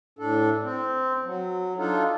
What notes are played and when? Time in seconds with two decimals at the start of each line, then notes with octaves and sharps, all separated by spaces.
0.19 A2 D4 A4
0.64 C4
1.24 F#3
1.78 D4 D#4 F4 A4